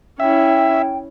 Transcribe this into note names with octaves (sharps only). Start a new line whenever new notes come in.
C#4 E4 E5 G5